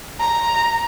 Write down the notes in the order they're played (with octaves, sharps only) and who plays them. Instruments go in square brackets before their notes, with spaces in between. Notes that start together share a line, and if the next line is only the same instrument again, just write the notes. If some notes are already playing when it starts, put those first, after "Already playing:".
[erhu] A#5